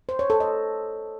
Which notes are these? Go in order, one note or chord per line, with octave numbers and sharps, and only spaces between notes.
C5
C#5
A4
D#5